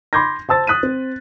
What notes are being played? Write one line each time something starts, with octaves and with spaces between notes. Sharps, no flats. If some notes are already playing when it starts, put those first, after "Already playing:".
B5 C6 D6 G6 G#6 A#6
C5 A5 E6 A6
D#6 F#6 B6 D#7
C4